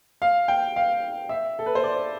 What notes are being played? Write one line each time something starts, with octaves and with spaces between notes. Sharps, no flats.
F5
G5
F5
E5
A4
B4
C5
D5